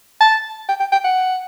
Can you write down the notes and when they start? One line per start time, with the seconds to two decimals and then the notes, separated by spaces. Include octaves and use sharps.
0.21 A5
0.69 G5
0.80 G5
0.92 G5
1.04 F#5